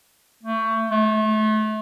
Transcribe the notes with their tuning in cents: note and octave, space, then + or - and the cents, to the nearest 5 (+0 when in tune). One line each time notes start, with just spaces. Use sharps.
A3 +25
A3 -30